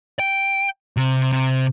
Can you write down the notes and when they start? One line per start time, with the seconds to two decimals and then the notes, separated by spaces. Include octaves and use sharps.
0.19 G5
0.97 C3
1.32 C3